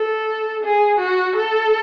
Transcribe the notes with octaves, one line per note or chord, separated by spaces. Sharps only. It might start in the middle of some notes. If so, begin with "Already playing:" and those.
Already playing: A4
G#4
F#4
A4